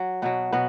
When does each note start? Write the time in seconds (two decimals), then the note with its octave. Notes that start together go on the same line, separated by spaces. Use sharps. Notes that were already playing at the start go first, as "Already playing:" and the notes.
Already playing: F#3
0.22 B2 F#3 B3
0.52 B2 F#3 B3